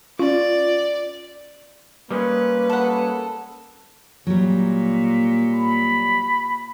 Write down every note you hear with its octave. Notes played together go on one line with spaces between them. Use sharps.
C#4 F4 D5
G3 G#3 A#3 C#4 B4
A4 F#5
A#2 F#3 G3
B5